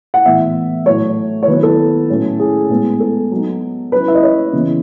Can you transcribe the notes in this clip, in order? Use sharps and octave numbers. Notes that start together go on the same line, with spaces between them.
F#5
A2 E3 B3 E5
A2 F#3 A3 C#5
C#5
D#3 F#3 B3 E4 B4
A4
A2 F#3 C#4 E4
G#4
A2 G#3 B3
A4
F#3 B3 D#4
F#3 C#4 E4 B4
E5
D#5
C#5
C#3 E3 B3 E4